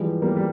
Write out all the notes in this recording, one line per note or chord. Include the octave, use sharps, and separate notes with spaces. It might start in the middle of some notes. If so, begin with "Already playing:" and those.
Already playing: E3 F3 G3 G#3
G3 A#3
G3